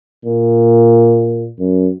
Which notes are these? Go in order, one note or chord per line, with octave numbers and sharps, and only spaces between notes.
A#2
F#2